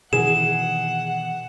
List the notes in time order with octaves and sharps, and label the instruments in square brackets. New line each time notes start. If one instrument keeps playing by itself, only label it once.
[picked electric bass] B2 D#3 E3 [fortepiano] G#4 [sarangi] F#5 [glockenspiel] E7